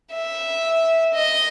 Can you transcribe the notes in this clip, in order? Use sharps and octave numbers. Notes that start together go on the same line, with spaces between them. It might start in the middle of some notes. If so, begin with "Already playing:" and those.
E5
D#5